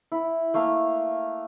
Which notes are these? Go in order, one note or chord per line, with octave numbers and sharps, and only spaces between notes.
E4
A3 A#3 F5